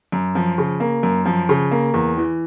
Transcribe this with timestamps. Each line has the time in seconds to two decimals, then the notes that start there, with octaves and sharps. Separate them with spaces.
0.12 F#2
0.35 F3
0.58 C#3
0.80 A#3
1.03 F#2
1.26 F3
1.49 C#3
1.71 A#3
1.94 E2
2.18 E3